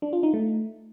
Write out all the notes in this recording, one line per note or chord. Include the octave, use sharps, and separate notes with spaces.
D4
F4
D#4
A3